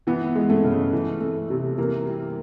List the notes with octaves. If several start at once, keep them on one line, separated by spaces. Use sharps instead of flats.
E3 B3
G#3
A3
C#3
E3
A3
C3
E3 A#3
G3